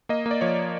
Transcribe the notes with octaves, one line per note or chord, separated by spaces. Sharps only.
A#3 D#5
A#3
D5
F3 C#5